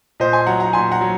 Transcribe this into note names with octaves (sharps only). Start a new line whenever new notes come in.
A#2 C5 D#5
G#5 C6
F#3 F#5 A#5
F#5 A#5
A#2 G#5 C6
F#5 A#5
F#3